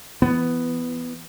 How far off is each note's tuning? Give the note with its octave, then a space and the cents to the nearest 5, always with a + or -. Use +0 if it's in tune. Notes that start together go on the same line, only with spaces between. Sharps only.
E3 +20 B3 +5